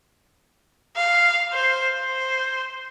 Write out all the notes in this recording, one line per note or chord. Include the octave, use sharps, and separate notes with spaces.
F5
C5
C5